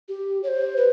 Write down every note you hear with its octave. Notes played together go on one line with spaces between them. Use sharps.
G4
C#5
C5
B4